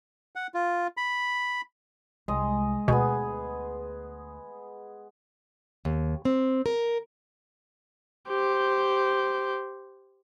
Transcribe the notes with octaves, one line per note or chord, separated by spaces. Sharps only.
F#5
F4
B5
C2 G#3 D#5
D2 B2 B3 G#4 G#5
D#2
C4
A#4
G4 C5